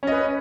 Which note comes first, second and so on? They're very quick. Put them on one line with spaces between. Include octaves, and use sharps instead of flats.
C#4 D#5 B4